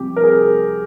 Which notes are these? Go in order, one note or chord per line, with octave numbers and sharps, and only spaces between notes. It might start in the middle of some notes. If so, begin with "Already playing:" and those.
Already playing: C2 F3 G4
A#4
C2 G#4